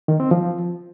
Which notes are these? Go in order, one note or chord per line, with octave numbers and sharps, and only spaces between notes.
D#3
C4
F3